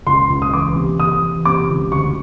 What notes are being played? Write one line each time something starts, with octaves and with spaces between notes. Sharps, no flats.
C#2 C6
C#2
D#6
E3 D6
C3
C3 D#6
E3
C3 D6
C#2
D2 C#6